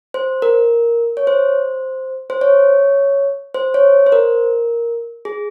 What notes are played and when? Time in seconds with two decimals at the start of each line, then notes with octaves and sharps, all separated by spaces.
0.14 C5
0.42 A#4
1.17 C#5
1.27 C5
2.30 C5
2.41 C#5
3.54 C5
3.74 C#5
4.07 C5
4.12 A#4
5.25 G#4